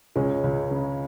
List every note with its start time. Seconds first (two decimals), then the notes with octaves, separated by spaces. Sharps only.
0.16 C#2 G#3 C#4
0.43 C#2
0.71 C#3